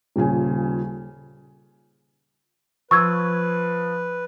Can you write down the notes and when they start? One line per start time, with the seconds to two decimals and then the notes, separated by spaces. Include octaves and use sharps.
0.16 D#1 A#2 C#3 G#5
2.91 F3 B4 C#6 E6 G#6